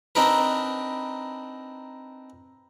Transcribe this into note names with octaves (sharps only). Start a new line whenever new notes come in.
C4 D4 D#4 A#4 B4